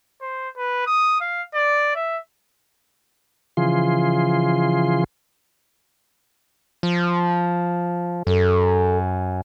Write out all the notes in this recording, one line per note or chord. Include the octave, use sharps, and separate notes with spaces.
C5
B4
D#6
F5
D5
E5
C#3 E3 F3 F4 G#4 C6
F3
F#2 A4